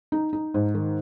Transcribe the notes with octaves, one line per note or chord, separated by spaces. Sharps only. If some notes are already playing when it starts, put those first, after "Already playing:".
D#4
D#4
G#2
D#3